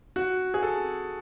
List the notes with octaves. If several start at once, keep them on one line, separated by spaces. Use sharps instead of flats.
F#4
G#4
A4